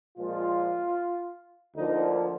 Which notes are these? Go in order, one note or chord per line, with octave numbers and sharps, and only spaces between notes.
A#2 F3 G#3 F4
D2 D3 F3 A#3 D#4